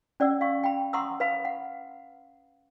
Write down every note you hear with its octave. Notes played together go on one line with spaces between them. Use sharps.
C#4 D5 F#5 E6
F5 C#6
G5 B5
F#5 A#5 C6 C#6 D#6 E6
B4 F5 B5
F#5